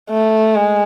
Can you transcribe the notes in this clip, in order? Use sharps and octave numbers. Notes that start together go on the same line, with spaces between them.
A3
G#3